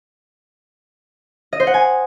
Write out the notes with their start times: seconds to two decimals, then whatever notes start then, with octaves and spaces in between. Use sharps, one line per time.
1.53 D#5
1.60 C5
1.67 F#5
1.74 G#5